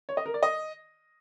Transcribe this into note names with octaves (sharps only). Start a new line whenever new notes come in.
C#5
D#5
A#4
D5
D#5